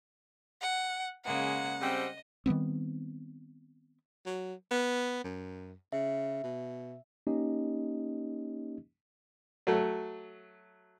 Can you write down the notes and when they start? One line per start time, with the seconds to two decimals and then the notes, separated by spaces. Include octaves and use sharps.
0.61 F#5
1.25 C#3 G#3 A#3 F#5
1.81 C#3 G3 C4 D#5
2.46 D#3 G3 B3 C4
4.26 F#3
4.71 B3
5.24 F#2
5.92 C#3 E5
6.44 B2
7.27 A#3 C#4 D#4 G4 D#5
9.67 F#3 A3